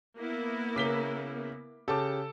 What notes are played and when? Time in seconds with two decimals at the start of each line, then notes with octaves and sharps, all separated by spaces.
0.17 A#3 B3 E4
0.76 C#3 A#4 D6 B6 G7
1.88 C#3 G4 A4 A5 D6